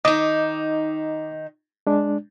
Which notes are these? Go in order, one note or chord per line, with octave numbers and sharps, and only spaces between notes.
D#3 D#4 D#5 D6
G#3 D4